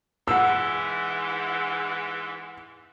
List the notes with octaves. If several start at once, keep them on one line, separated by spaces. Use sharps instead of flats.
G#2 E3 F#5 E6